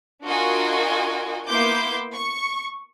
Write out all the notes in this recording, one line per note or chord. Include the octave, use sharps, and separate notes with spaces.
D4 F4 F#4 A#4 D#5 G#5
A#3 B3 E4 C6 D6 G6
C#6